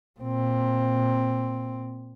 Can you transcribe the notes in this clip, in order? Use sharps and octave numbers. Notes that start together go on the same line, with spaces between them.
A#2 C4